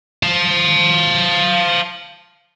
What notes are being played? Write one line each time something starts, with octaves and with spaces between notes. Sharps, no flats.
F5 A5